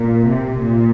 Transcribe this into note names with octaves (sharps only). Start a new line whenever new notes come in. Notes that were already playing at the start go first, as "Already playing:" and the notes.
Already playing: A#2
C3
A#2